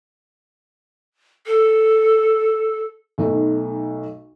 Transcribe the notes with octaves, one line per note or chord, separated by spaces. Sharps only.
A4
B1 A3 D#4